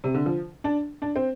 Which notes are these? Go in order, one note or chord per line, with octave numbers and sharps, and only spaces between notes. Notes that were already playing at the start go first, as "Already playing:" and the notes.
C3
D3
F3
D4
D4
C4